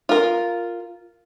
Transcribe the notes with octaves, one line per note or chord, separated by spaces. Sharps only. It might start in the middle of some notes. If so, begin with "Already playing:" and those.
F4 A#4